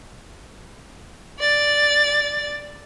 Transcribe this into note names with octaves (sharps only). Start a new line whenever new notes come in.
D5 A6